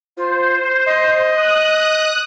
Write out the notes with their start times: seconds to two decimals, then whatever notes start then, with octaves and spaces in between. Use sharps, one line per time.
0.17 F4 C5
0.86 D#5
1.31 D#6 F#6